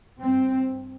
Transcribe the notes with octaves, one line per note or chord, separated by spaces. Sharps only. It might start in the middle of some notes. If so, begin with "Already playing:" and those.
G2 C4